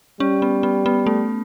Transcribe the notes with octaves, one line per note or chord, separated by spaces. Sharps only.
G3 C#4
B3
B3
B3
A3